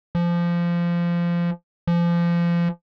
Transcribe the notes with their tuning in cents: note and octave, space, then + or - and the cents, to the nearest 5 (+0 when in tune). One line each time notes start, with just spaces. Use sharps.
F3 -20
F3 -30